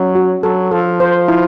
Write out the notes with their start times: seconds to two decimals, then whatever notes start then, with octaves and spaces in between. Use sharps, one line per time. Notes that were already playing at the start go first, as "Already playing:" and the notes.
Already playing: F#3 C#4
0.15 F#4
0.43 F#3 A4
0.71 F3 A4
1.00 C5
1.28 E4